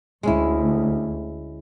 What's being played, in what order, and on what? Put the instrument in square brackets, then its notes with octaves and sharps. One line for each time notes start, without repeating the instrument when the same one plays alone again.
[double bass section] D2 [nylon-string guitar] G#3 C#4 E4